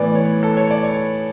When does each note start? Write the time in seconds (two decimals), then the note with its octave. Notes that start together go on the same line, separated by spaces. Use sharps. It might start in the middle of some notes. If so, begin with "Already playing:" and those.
Already playing: A2 E3 B3 D5
0.15 C#5
0.43 A4
0.57 C#5
0.71 D5
0.84 C#5